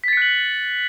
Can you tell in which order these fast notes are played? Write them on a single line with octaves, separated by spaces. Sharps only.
B6 A6 C#7 F#6 F#7